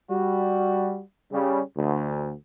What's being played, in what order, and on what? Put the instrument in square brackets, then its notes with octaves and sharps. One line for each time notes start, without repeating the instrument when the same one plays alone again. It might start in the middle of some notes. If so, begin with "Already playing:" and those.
[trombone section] G3 F#4
C#3 G3
D2